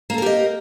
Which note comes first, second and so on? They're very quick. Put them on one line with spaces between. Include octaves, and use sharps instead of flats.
A#3 A4 A#4 G4 D#5